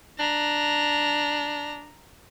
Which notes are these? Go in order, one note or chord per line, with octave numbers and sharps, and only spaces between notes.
D4 A#5